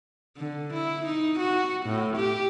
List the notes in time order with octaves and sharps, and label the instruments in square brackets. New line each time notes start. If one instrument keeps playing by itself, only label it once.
[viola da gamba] D3
E4
D#4
F#4
A2
G4